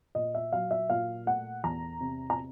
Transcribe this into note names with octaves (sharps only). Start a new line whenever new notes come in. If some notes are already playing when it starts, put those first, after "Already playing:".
A#2 D#5
E5
F#3 F5
E5
A#2 F5
A3 F#5
E2 A#5
C3
A#5